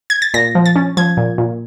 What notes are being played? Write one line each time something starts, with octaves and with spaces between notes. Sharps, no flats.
G#6
A6
A#2 A#6
F3
A6
C#4
F3 G#6
A#2
A#2